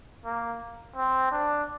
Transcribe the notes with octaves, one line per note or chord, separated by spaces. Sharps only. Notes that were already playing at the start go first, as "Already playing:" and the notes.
A#3
C4
D4